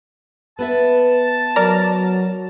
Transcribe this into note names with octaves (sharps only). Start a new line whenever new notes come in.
B3 B4 E5 A5
F#3 A#4 D5 A#5